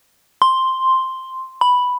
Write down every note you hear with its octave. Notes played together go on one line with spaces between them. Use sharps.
C6
B5